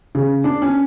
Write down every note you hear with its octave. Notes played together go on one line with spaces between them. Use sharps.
C#3
D4
C#4